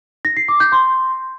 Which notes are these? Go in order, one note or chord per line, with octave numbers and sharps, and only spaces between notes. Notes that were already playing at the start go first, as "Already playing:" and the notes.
A#6
C7
D6
G6
C6